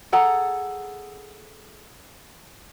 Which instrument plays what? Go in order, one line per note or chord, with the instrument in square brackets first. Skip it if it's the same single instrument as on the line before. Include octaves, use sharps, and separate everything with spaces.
[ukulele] G#4 A4 F#5 A#5